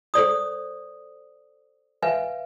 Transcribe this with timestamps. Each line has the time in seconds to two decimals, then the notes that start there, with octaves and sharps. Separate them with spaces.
0.14 A4 C5 D5 D#6
2.02 B4 E5 F5 G#5